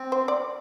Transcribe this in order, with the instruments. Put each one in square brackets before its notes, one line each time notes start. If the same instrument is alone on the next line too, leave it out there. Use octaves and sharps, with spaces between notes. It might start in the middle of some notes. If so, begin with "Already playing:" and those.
Already playing: [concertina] C4
[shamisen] C5
D5